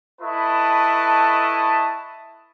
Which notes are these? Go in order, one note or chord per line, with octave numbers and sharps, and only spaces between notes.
E4 A4 B4 D#5 A5 C#6